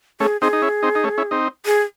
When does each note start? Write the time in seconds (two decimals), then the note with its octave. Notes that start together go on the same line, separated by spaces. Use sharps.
0.20 A3 C#4 G#4
0.41 C4 D#4 G#4
0.53 D#4
0.62 C#4 E4
0.83 C4 D#4
0.95 D#4
1.04 A3 C#4
1.18 C#4 E4
1.31 C4 D#4
1.66 G#4